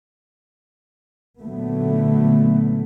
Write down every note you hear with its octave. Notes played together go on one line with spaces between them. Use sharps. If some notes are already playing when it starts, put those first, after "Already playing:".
A#2 D3 F#3 A3 B3